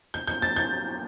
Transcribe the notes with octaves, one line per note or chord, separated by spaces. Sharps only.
G6
G6
A6
G6